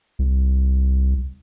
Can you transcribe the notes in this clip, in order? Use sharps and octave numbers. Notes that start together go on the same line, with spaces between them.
C2